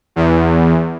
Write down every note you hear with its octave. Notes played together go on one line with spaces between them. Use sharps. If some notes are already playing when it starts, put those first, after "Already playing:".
E2